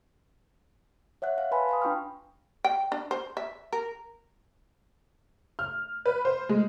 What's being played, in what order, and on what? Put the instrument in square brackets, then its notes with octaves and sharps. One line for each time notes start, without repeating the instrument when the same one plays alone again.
[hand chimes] C#5 E5 F#5 F#6
F5
B4 G#5 A5 B5 C6
F5 C6 D#6
D4 F4 G5 C#6 F6
[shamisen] G5
D4
C5
E5
A#4
[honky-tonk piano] F6
B4
C5
G#3